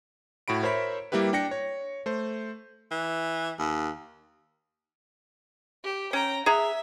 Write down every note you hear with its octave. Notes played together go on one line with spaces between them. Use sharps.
A2 F#4 B5 D7
A#4 C5 C#5 E5 B5 B6
G3 A#3 E4 G4 B4
D4 G5 A#6 C#7
C#5
A3 C5
E3
D#2
G4
C#4 G5 A#5
G#4 E5 F#5 A#5